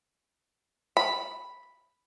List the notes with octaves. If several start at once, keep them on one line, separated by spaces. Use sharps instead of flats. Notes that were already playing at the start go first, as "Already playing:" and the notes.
B5